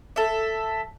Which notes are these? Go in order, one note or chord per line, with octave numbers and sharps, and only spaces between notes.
A4 E5